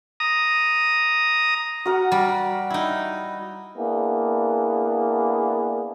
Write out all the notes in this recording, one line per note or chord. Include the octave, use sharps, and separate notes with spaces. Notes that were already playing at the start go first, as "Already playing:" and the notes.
A#5 D#6
F#4 A#4 F#5
G3
D#4 E4
A#3 B3 D4 E4 G#4